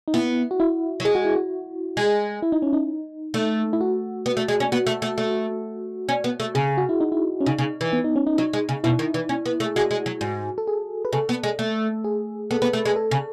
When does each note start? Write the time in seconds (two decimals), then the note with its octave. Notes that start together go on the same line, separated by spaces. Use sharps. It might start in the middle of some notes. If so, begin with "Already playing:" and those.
0.08 D#4
0.14 B3 E4
0.51 F#4
0.60 E4
1.00 F#3
1.05 G#3 G#4
1.15 F#4
1.25 E4
1.36 F#4
1.97 G#3
2.42 E4
2.52 D#4
2.62 C#4
2.73 D#4
3.34 A3
3.73 E4
3.81 F#4
4.26 B3
4.37 A3
4.48 G#3
4.60 C#4
4.72 B3 F#4
4.87 A3
5.02 A3
5.18 A3
6.09 C#4
6.24 B3
6.40 A3
6.55 C#3 G#4
6.78 F#4
6.89 E4
7.01 D#4
7.12 E4
7.41 C#4
7.46 C#3 D#4
7.58 C#3
7.81 E3
7.93 B3
8.04 D#4
8.16 C#4
8.27 D#4
8.38 F#3 D#4
8.53 G#3
8.69 C#3
8.84 B2 E4
8.99 D#3
9.14 E3
9.29 C#4
9.46 B3
9.60 A3
9.66 G#4
9.76 G#3 F#4
9.91 G#3
10.06 F#3
10.21 G#2
10.58 A4
10.67 G#4
11.05 B4
11.13 C#3 A4
11.29 B3
11.44 G#3
11.59 A3
12.04 G#4
12.51 B3 A4
12.62 B3 B4
12.73 A3 A4
12.85 G#3
12.96 A4
13.11 C#3